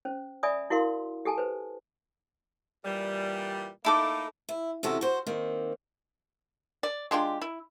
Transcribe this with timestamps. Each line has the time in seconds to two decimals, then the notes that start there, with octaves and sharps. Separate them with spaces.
0.05 C#4 C5
0.43 D5 E5 G#5 B5 D#6
0.70 E4 F#4 A#4 F5 C6
1.25 G4 A4 G#5 A5
1.38 B4 C5
2.84 A#2 E3 G3
3.85 A3 A#3 D#4 E4 A4 D6
4.49 E4
4.83 E2 C3 C#4 F#4 A4
5.01 F#4 C5
5.27 D#3 A#3 C4
6.83 D5
7.11 G#3 D4 F4 G4
7.41 E4